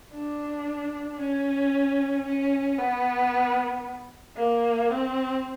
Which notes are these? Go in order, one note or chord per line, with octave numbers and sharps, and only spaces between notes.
D4
C#4
C#4
B3
A#3
C4